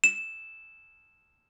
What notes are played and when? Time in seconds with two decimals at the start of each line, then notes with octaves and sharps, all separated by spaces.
0.04 E7